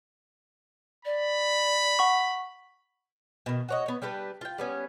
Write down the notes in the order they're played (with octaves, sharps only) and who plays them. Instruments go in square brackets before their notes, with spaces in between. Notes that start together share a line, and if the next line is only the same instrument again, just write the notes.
[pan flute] D5 [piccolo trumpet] B5
[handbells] F#5 C#6
[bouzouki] B2 D#3
F#4 C#5 D#5
B3 C#5
G3 D4 G4 B4
F4 G5
G3 B3 C#4